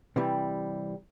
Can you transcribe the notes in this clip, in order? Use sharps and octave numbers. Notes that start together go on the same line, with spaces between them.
C3 E3 G3